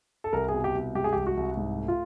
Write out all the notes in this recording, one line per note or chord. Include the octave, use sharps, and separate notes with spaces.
A4
C2 A#4
G#4
B2
G4
C2
G#3 G4
G#4
C2 G4
F#4
C2
G#2
A3
F4